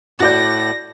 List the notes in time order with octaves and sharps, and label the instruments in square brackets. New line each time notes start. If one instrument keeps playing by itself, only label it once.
[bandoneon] A2 [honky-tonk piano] F#4 D5 G6 [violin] A#6